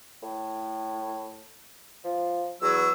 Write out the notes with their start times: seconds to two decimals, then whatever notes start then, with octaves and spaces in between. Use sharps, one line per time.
0.22 A2
2.04 F3
2.62 E2 F#3 E6